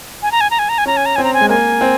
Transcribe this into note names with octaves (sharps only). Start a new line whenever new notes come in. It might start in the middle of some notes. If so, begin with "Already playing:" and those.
G#5
A#5
G#5
A#5
G#5
A#5
G#5
C#4 A#5
G#5
A#5
C4 G#5
A#5
G#5
G#3
A#3 G#5
C4